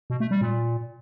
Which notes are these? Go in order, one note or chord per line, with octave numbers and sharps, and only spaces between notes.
B2
A3
G3
A#2